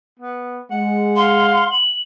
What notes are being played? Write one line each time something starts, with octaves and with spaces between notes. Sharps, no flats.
B3
G#3 F#5
F5 C6
F#7